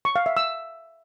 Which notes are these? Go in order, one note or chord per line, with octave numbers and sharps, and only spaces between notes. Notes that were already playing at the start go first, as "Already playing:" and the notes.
C#6
F5
E5
E6